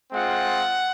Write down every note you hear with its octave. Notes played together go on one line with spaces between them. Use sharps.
G#3 C4 F4 F#5